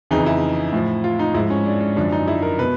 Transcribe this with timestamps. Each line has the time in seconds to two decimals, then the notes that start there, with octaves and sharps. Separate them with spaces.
0.11 F2 C#3 E3 D#4
0.26 E4
0.72 A2 F3
1.04 F4
1.19 D#4
1.34 G#2 F3 E4
1.50 C#4
1.66 D4
1.81 C#4
1.96 F#2 D3 F3 D4
2.12 D#4
2.28 E4
2.42 A#4
2.59 B2 B4